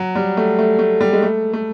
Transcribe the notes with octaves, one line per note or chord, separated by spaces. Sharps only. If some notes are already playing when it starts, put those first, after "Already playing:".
Already playing: F#3
G3
A3
A3
A3
G3
G#3
A3
A3